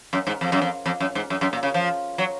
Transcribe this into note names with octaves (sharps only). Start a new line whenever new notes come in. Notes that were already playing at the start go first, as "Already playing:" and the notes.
F#2
G#2
F2
F#2
F2
F2
F#2
G#2
F#2
F#2
A#2
C#3
F3
F#3